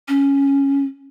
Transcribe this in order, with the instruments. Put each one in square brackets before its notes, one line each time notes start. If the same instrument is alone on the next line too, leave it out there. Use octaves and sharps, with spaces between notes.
[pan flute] C#4